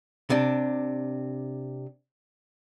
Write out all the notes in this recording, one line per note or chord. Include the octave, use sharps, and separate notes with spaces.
C3 D4